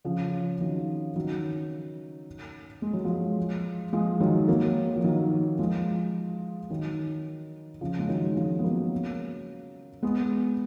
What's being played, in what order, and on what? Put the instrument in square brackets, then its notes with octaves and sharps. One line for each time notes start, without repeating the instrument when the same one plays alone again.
[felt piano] C#3 F3
D#3 F#3
D#3 F#3
G#3
F#3
F3 G#3
F3 G#3
D#3 F#3
F#3 A#3
F3
D#3 F#3
F3 G#3
D#3 F#3
C#3 F3
G#3
D#3 F#3
F3 G#3
B3
F#3 A#3
G#3 B3